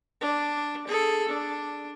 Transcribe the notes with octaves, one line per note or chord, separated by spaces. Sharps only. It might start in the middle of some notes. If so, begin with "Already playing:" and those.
D4
G#4 A4
D4